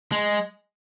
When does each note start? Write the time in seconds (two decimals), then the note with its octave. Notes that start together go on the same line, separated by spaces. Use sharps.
0.12 G#3